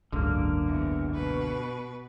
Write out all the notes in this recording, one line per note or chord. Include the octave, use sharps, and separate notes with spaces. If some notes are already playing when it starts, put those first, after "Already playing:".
F#1 C#2 G#2 D3 A#3
E2
B2 B4